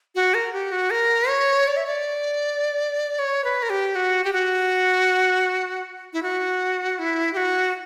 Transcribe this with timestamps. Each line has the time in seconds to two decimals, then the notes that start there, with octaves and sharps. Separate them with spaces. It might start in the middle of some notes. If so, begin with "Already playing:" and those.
0.15 F#4
0.34 A#4
0.53 G4
0.72 F#4
0.90 A#4
1.29 C#5
1.67 D5
1.77 E5
1.87 D5
3.19 C#5
3.44 B4
3.63 A#4
3.70 G4
3.95 F#4
4.24 G4
4.33 F#4
6.13 E4
6.23 F#4
6.99 E4
7.33 G4
7.37 F#4